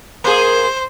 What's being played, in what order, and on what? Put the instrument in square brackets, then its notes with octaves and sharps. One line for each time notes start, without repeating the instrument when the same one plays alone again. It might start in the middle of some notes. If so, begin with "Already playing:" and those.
[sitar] A#3 G#4 [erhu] C5